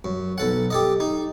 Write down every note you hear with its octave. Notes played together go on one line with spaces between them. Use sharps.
F#2
B1 A4 F#5
G4 A4 D#5
D#4